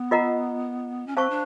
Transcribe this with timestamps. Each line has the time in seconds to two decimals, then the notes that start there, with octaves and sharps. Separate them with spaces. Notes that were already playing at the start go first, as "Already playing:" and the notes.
Already playing: B3
0.11 F4 A#4 D#5 F#5 A#5
1.07 C#4
1.16 C4 C5 F5 A5 C#6
1.30 D4